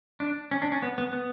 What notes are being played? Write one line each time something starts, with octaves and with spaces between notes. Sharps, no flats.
D4
C#4
D4
C#4
B3
B3
B3